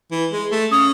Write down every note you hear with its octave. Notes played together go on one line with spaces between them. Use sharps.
E3
G#3
A3
C#4 D#6